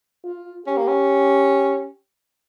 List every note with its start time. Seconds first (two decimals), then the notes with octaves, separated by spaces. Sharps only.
0.25 F4
0.66 C#4 G4
0.77 A#3
0.88 C#4